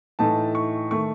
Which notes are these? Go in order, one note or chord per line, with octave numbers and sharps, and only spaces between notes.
A2 E3 A3 D#4 A5
C#6
D#3 A3 C#6